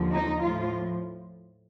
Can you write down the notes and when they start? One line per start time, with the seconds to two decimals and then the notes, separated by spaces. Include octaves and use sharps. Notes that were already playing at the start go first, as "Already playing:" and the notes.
Already playing: D#2 D3 F3
0.11 D#4
0.40 A2 F3 F4